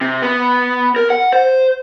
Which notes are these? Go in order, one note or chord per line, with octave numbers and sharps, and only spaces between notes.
C3
B3
A#4
F#5
C5